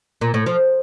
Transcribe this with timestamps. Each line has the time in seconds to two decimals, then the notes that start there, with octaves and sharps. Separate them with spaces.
0.21 A#2
0.34 A2
0.46 F3